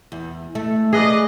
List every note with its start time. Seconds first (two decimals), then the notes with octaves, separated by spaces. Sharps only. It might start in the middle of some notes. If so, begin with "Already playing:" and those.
0.12 E2
0.55 A3
0.93 G#4 B4 D5 D#5